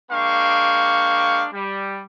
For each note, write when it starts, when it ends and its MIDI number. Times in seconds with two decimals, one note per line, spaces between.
0.11 1.47 56
0.11 1.47 58
0.11 1.47 62
0.11 1.47 77
0.11 1.47 79
0.11 1.47 85
1.53 2.03 55